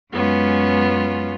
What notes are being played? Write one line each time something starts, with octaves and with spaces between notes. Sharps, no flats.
F#2 G#3 B3 C#4 F4